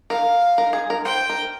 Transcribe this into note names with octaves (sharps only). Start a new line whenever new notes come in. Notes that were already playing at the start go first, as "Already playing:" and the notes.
A#4 F5
A#4
G#4
A#4
C5 G5
A#4